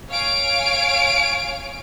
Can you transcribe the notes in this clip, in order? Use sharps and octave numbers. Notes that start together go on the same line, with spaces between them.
C#5 F5 G#5 D7